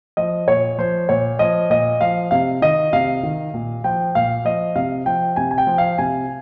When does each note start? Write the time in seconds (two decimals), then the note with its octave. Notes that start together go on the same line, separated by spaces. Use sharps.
0.17 F3 D#5
0.48 A#2 C#5
0.78 F3 C5
1.09 A#2 C#5
1.39 F3 D#5
1.70 A#2 D#5
2.01 F3 F5
2.31 C3 F5
2.62 D#3 D#5
2.93 C3 F5
3.23 D#3
3.54 A#2
3.84 F3 G5
4.15 A#2 F5
4.45 F3 D#5
4.75 C3 F5
5.06 F3 G5
5.36 C3 G#5
5.51 G#5
5.58 G5
5.67 F3
5.78 F5
5.98 C3 G#5